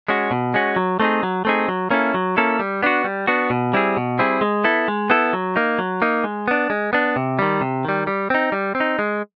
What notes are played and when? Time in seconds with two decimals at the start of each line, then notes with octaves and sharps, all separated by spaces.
0.08 G#3 C#4 F#4
0.31 B2
0.54 G#3 C#4 F#4
0.76 F#3
1.00 A3 C4 D#4 G#4
1.23 F#3
1.45 A3 C4 D#4 G#4
1.68 F#3
1.90 A#3 C#4 E4 A4
2.14 F#3
2.37 A#3 C#4 E4 A4
2.59 G3
2.83 B3 D4 F#4
3.04 G3
3.27 B3 D4 F#4
3.50 B2
3.73 G3 C4 E4 G#4
3.97 B2
4.19 G3 C4 E4 G#4
4.41 G#3
4.64 B3 E4 A4
4.88 G#3
5.10 B3 E4 A4
5.33 F#3
5.56 A#3 D#4
5.78 F#3
6.02 A#3 D#4
6.24 G#3
6.48 B3 D4
6.70 G#3
6.93 B3 D4
7.16 C3
7.39 D#3 G3
7.61 C3
7.85 D#3 G3
8.07 G3
8.30 C4 D#4
8.52 G3
8.75 C4
8.80 D#4
8.99 G#3